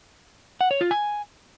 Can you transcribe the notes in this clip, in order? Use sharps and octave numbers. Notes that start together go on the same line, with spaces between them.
F#5
C#5
F4
G#5